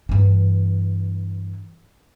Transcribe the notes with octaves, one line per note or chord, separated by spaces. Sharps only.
G2 E3